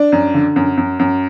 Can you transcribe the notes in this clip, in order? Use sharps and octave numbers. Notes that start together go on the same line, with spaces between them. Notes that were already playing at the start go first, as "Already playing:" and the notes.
Already playing: D4
F#2
D3
F#2
F#2
F#2